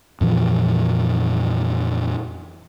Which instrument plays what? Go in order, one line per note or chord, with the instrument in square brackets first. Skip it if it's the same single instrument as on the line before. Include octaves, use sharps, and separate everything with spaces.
[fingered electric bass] F2 A#2 E3 F3